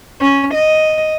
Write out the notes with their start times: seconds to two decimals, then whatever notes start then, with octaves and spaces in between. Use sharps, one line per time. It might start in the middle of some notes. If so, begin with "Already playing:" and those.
0.21 C#4
0.54 D#5